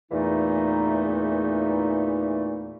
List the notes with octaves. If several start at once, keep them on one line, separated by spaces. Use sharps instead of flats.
E2 A#2 E3 A3 D#4